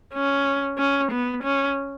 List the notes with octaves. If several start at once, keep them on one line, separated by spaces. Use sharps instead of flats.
C#4
C#4
B3
C#4